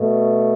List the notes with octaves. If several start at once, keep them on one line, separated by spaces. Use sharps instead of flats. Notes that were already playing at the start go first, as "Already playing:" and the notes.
Already playing: B2 A3